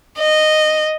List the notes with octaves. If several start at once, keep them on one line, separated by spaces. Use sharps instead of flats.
D#5